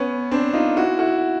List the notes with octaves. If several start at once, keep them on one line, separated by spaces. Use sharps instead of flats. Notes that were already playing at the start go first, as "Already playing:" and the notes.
Already playing: B3 C#4
C4 D4
D#4 F4
E4 F#4
E4 F#4